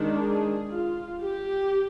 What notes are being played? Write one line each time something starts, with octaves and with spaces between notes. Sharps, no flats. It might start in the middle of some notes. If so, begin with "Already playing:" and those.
Already playing: D#3 G#3 D4
G#4
F4
G4